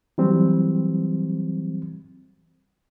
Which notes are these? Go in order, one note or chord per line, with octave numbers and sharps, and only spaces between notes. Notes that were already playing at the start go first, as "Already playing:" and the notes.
E3 F#3 G3 C4